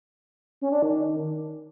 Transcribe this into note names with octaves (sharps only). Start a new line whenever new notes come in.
C#4
D4
D#3